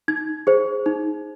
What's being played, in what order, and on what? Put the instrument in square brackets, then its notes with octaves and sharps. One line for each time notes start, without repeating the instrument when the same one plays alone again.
[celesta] D#4 G#6
G#4 C5
D#4